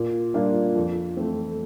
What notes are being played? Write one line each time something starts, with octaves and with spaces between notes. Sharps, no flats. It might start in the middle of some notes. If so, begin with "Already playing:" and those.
Already playing: A#2
G3 A#3 D4 F4
F2
E3 A3 C4